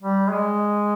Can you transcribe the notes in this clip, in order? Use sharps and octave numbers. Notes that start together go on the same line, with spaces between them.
G3
G#3